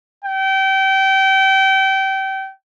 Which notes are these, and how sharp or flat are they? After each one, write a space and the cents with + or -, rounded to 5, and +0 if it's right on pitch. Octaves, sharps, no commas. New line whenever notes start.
G5 -30